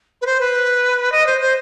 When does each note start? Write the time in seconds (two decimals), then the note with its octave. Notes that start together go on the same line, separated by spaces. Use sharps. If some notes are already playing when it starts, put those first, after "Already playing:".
0.21 B4
0.26 C5
0.40 B4
1.12 D#5
1.26 C5
1.40 C5